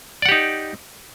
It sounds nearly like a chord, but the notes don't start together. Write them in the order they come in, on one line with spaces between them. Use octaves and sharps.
D5 F#5 G4 D#4